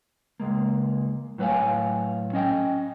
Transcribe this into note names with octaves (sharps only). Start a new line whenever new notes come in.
C#2 G#3 A#3
A2 F#3 B4 C#5 F5 G#5
C#4 D#5 G5